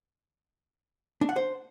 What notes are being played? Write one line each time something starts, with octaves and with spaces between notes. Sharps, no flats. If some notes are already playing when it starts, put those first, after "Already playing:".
D4
F#5
C5